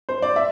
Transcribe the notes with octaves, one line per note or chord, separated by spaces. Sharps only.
C5
D5
E5